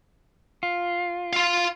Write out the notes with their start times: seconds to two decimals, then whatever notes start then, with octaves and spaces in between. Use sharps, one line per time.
0.63 F4
1.33 F5 C6